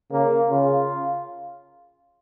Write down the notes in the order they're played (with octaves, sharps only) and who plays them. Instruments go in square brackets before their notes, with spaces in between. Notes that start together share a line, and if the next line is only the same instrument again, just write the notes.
[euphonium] C#3 [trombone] A#3
[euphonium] C#3 [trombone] F4